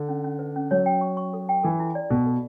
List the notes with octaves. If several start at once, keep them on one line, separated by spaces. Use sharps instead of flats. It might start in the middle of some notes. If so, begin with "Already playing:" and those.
Already playing: D3
C#4
C#4
B4
C#4
F#3 C#5
G5
C#6
C#6
A4
G5
E3 A4
E4
D5
B2 A4
A4